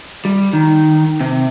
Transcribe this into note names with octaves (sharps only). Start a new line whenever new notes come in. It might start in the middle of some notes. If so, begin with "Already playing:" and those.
G3
D#3
C3